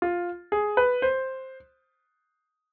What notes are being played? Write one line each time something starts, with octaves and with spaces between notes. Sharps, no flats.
F4
G#4
B4
C5